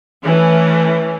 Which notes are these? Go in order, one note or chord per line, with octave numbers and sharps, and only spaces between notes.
E3 A3 C#4